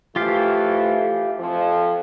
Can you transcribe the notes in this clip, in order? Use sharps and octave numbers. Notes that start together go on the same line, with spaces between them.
E3 F3 A3 F4 G4 F5
F2 F3